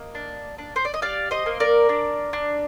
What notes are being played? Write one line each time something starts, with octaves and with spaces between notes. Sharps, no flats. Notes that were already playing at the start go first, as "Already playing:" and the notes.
Already playing: A#3 D#5
D4
D4
C5
D5
D#5
G4 D5 F5
C5 D#5
A#3
A#4 D5
D4
D4